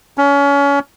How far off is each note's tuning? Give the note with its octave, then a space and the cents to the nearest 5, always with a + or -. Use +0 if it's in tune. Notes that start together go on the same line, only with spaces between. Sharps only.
C#4 +30